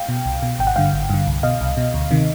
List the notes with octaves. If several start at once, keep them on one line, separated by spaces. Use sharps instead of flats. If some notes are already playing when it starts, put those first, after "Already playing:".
Already playing: F5 G5
B2
C2
B2
G#1 G5
F#5
G2 D3 F5 G5
G#1
G2 D3
C2
B2 D#5 F5
C2
B2
D2
C3 D#3